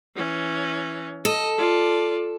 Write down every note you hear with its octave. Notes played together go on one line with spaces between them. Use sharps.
E3 C#4
A4 D#5
F4 D5